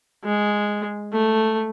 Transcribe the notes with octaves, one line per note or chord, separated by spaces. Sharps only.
G#3
A3